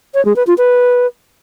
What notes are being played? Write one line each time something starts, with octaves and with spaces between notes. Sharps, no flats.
C#5
G#3
B4
F4
B4